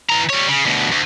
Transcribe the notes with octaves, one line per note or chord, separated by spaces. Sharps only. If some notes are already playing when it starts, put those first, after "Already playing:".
E3 A#5
G3 C#5
C#3
D2 B2
D2